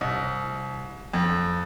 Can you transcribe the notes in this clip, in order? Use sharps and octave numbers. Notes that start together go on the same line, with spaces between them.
C2
F2